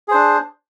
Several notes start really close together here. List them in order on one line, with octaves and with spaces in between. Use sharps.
G#4 C5 D4